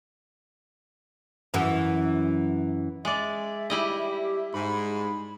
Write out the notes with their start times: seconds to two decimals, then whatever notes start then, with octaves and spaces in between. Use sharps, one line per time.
1.54 F#2 E3
3.05 G#3 D5 E5
3.70 G3 E4 G4 D#5
4.54 G#2 B5